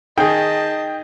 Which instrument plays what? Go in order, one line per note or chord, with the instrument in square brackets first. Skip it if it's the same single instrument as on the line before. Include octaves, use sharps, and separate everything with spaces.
[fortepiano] D#3 G#4 [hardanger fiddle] D#5 A5 [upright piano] G5